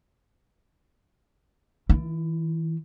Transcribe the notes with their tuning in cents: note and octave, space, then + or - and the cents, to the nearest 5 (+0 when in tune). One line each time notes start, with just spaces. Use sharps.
E3 -35 E4 +30